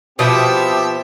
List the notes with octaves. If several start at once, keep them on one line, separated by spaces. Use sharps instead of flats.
B2 F3 C4 G4 E5 D#6